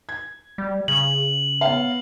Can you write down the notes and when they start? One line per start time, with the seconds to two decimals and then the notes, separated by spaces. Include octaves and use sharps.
0.09 G#6
0.58 G3
0.88 C#3 F#7
1.61 B3 C#5 F5